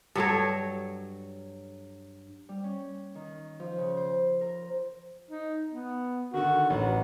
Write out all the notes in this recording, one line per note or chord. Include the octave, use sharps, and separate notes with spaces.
G2 F#3 A4 C#5
G3
C#4
D#3
F3
C#3
C5
A#4
D#4
B3
D3 D#3 F#4
A1 F#3